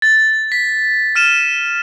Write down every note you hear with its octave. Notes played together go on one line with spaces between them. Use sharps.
A6
B6
F6 D#7 E7